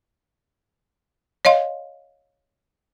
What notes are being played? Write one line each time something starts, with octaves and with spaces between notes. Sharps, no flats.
C#5 D#5 F5 C6